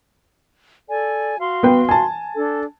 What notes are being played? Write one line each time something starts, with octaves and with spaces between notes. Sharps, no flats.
A4 D5 G#5
F#4 F5 C6
B3 B4 G5
G#5 A5
D4 A4